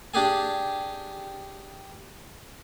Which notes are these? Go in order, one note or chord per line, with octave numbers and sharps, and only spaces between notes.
D4 G4 G#4 G#5